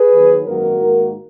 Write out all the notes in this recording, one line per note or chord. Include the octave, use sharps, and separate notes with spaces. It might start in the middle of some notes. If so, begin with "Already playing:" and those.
Already playing: G#4 B4
D#2 D#3 F#3
G#1 F#2 D#3 A#3 F#4 A#4
G#2 D#3 A#3